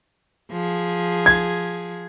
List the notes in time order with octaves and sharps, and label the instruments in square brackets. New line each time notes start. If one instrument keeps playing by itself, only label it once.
[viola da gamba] F3 G#4
[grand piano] G#6